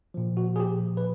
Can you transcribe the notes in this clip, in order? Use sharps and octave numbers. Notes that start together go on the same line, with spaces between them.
A#2 F3
F#4
G#4
G4
B4